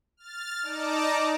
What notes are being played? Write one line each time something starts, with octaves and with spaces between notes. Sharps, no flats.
F6 A6
D#4 D5 A5 A#5 D6